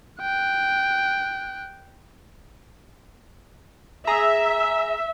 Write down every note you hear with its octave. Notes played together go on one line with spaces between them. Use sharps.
G5 F#6
G#4 E5 A#5